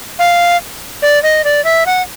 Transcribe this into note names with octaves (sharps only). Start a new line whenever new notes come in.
F5
D5
D#5
D5
E5
F#5